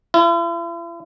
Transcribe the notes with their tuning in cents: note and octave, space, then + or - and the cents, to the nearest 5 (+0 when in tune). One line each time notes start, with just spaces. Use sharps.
E4 +45